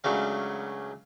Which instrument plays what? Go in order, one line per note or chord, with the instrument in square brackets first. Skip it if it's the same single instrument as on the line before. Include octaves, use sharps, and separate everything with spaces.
[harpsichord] C#2 C#3 F#3 A3 D4 F5